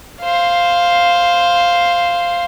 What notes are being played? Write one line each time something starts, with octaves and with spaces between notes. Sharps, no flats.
C5 F5